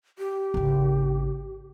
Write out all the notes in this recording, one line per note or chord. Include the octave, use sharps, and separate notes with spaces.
G4
G#1 C#3